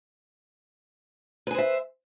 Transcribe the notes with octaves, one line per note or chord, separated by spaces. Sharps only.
B4 C5 E5 G#5